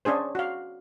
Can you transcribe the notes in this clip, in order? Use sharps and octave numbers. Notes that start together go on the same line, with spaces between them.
C#4 D4 G#4 C5
F#4 F5